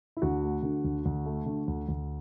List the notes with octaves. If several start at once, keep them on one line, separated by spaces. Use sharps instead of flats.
E4
D2 D4 F#4
A3
D3
D2
D2
A3
D3
D2
D2